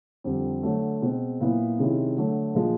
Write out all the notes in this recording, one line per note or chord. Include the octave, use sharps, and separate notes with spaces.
F2 D3 G3 C4
D3 F#3 A3
B2 G#3 C4
A#2 F#3 B3 E4
C3 D#3 G#3 C#4 E4
D3 F#3 A3
A#2 F3 G#3